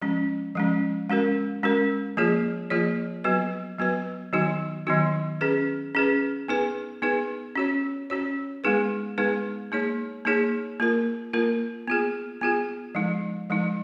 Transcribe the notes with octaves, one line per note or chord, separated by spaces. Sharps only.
F3 G#3 C#4
F3 G#3 C#4
G#3 C#4 F#4 A#4
G#3 C#4 F#4 A#4
F3 A#3 F4 G#4 C#5
F3 A#3 F4 G#4 C#5
F#3 B3 F#4 B4
F#3 B3 F#4 B4
D#3 F#3 B3 D#4 F#4
D#3 F#3 B3 D#4 F#4
C#4 G#4 B4
C#4 G#4 B4
B3 D#4 G#4 B4
B3 D#4 G#4 B4
C#4 F#4 C#5
C#4 F#4 C#5
G#3 B3 D#4 G#4 B4
G#3 B3 D#4 G#4 B4
A#3 D#4 G#4 C#5
A#3 D#4 G#4 C#5
A#3 F4 A#4
A#3 F4 A#4
B3 F4 G#4
B3 F4 G#4
F3 G#3 D#4
F3 G#3 D#4